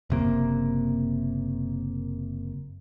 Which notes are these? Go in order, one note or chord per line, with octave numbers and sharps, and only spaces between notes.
F#1 C3 A#3